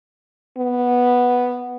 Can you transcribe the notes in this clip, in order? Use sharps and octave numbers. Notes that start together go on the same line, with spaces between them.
B3